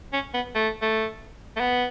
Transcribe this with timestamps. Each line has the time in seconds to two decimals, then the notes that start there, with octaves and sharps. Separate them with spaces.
0.13 C#4
0.34 B3
0.55 A3
0.82 A3
1.56 A3
1.60 B3